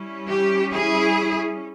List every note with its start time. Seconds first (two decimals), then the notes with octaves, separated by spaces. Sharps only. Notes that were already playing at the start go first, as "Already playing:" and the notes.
Already playing: G3 C#4 E4
0.29 G4
0.73 E4 G#4